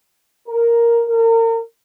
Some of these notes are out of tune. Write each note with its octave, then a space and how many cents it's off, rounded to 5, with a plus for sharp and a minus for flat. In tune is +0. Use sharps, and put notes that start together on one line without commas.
A#4 +0
A#4 -35